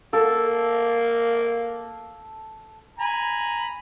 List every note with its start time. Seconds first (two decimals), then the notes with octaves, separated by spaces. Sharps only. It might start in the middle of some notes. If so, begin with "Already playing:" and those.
0.13 A#3 A4
2.99 G#5 A#5 B5